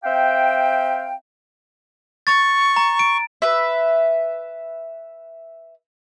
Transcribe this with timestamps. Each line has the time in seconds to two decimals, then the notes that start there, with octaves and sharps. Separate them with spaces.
0.04 C4 E5 F5 G5
2.27 C#6 A6
2.76 A#5
2.99 D7
3.42 B4 E5